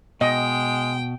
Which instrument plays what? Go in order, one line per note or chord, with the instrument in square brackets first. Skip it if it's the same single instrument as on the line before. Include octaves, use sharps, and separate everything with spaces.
[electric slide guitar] B2 [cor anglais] G#3 [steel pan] D#5 [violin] G5